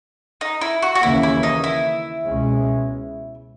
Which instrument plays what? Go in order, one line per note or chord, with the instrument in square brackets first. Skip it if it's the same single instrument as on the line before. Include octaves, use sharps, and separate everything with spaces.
[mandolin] D#4
E4
F#4
F#4
[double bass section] D#2 C#3 E3 A#3 C#4 [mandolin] E4
[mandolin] E4
D#4
E4
[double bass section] C#2 B2 G#3 C#4